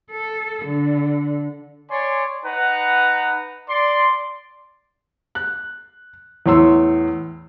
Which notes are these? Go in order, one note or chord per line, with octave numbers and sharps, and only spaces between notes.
A4
D3
C#5 D5 G#5 C6
D#4 B4 F#5 A#5
D5 C6
F#6
E2 A2 C#5 C6 E6